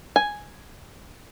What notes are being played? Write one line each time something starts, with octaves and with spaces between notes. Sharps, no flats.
G#5